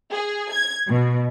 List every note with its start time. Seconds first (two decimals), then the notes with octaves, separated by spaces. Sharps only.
0.12 G#4
0.52 G#6
0.88 B2